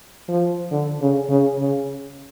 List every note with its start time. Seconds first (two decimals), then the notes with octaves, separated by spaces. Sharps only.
0.29 F3
0.72 D3
1.01 C#3
1.29 C#3
1.59 C#3